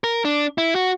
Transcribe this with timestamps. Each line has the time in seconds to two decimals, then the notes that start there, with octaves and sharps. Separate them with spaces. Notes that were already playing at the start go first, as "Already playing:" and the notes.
0.04 A#4
0.25 D4
0.58 E4
0.75 F#4